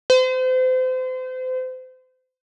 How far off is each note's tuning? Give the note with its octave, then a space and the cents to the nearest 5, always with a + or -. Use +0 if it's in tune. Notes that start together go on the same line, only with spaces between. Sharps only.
C5 -35